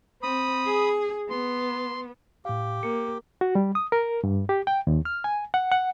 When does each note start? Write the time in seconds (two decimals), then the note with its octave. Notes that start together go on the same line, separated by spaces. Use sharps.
0.23 C4 B5 D#6
0.66 G#4
1.30 B3 C6
2.45 A2 G4 F5
2.83 A#3 C#7
3.41 F#4
3.55 G3
3.75 D#6
3.92 A#4
4.24 G2
4.49 G4
4.67 G5
4.87 D#2
5.05 F6
5.24 G#5
5.54 F#5
5.72 F#5